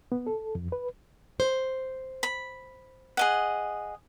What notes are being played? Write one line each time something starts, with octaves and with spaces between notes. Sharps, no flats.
B3
A4
F2
B4
C5
B5
G#4 D#5 F#5